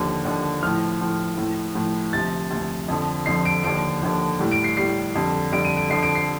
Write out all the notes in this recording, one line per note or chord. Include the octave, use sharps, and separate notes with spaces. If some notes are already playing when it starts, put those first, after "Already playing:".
Already playing: D#2 D3 F3
D#2 D3 F3
A2 F3 F6
A2 F3
A2 F3
A2 F3
D2 C3 F3 A6
D2 C3 F3
F2 D3 F3
F2 D3 F3 C7
D7
D#2 D3 F3 D7
D#2 D3 F3
A2 G3
D7
C7
A2 G3 C7
F2 D3 G3
F2 D3 G3 D7
D#7
D7
F2 D3 F3 C7
D7
C7